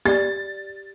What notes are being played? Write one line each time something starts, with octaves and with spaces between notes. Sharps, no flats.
G4 D5 A6